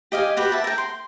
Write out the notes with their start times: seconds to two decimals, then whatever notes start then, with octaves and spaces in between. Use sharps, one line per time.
0.12 G4 D#5 F5 G#5
0.37 F#4 G4 B4
0.52 E5 A5
0.64 A#4 G5
0.78 C6